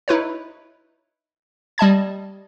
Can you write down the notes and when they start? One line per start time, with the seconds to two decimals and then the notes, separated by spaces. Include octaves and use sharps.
0.08 D#4 E4 B4 C#5
1.78 G3 D#5 A5 G#6